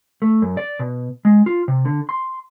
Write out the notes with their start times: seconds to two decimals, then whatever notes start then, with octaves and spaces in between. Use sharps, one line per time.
0.22 A3
0.42 F#2
0.57 D5
0.79 B2
1.25 G#3
1.46 F4
1.68 C3
1.85 D3
2.09 C6